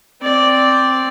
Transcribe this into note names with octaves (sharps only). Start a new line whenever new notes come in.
C4 D5